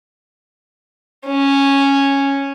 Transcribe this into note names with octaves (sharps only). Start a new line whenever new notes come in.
C#4